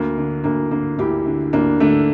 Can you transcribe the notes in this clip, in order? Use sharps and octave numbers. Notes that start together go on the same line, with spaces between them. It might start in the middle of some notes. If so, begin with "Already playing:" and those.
Already playing: D2 A#3
D3
D2 A#3
D3 A#3
D2 E4 G4
D3
D2 A#3 D4
D3 A3